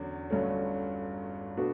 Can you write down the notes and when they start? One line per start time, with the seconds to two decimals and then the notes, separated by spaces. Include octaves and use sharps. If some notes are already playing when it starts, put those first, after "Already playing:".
Already playing: E2 D3 F#3 C#4
0.30 G1 G2 F#3 A3 C#4
1.57 B2 A3 D4 F#4 B4